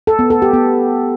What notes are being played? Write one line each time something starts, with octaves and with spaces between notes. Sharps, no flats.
A4
B3
A4
G4
B3